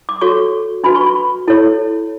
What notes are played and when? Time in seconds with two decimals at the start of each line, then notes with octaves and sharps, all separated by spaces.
0.09 D6
0.21 F#4 A4 C#5 C#6
0.84 D4 F#4 B4 B5
0.96 C#6
1.06 B5
1.48 E4 A4 C#5